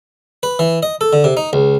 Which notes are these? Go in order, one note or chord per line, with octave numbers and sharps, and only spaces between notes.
B4
E3
D#5
A4
D3
C3
D#4
C#2